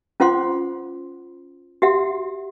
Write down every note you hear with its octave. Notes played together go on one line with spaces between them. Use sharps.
C#4 F4 C5 F#5 C6 D6
F#4 G4 E5 F#5